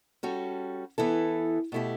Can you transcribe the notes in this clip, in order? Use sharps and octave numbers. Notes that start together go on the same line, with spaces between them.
G3 C#4 F#4 A4
E3 B3 E4 A4
B2 A3 E4 G4